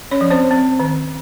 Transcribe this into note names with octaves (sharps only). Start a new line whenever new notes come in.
C#4 C#5
F3
C4 C5
C4
D#3